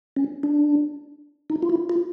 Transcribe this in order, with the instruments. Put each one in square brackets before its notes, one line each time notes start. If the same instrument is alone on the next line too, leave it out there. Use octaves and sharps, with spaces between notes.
[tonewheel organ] C#4
D4
D#4
F4
E4
F4